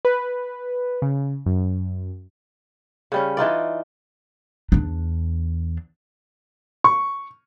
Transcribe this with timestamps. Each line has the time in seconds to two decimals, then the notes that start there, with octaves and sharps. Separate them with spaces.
0.05 B4
1.02 C#3
1.46 F#2
3.12 C#3 G3 C#4
3.37 E3 D#4 F4 D5
4.72 E2 D4
6.84 C#6